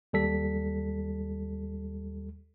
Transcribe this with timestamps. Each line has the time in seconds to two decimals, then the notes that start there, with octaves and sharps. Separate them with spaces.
0.13 D#2 G3 A4 B6